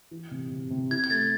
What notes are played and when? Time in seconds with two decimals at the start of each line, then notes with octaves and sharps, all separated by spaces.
0.11 E3
0.31 C3
0.51 C3
0.70 C3
0.91 E4 G#6
1.04 G#6
1.10 A3 A6